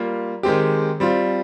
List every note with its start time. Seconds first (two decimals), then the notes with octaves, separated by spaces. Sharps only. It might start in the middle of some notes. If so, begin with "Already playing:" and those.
Already playing: G3 A#3 F4
0.43 D#3 G#3 C4 G4
1.00 G3 C4 F4